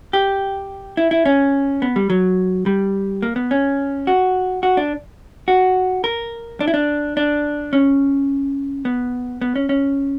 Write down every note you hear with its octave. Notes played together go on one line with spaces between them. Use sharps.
G4
E4
E4
C#4
B3
G3
F#3
G3
A#3
B3
C#4
F#4
F#4
D4
F#4
A#4
D4
E4
D4
D4
C#4
B3
B3
C#4
C#4